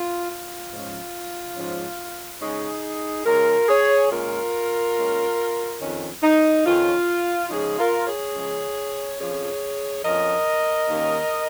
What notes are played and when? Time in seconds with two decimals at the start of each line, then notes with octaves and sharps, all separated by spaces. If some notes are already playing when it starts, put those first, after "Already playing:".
Already playing: F4
0.29 F4
0.72 G#2 F3 C#4
1.57 G#2 F3 C#4
2.41 C#3 G#3 C#4 D#4 G#4
3.26 C#3 G#3 C#4 F4 A#4
3.68 G#4 C#5
4.11 A#2 G#3 C#4 F4 A#4
4.96 A#2 G#3 C#4
5.80 F2 D#3 C#4
6.23 D#4
6.65 F2 D#3 C#4 F4
7.50 C#3 F3 G#3 C#4 D#4 G#4
7.78 F4 A#4
8.06 G#4 C#5
8.35 C#3 F3 G#3 C#4
9.19 F2 F3 C#4 G#4 C#5
10.04 F2 F3 C#4 A#4 D#5
10.89 D#2 D#3 A#3 C#4